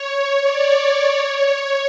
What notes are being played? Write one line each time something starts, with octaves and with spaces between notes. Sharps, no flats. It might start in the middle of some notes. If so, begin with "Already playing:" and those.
Already playing: C#5
D5
C#5
C#5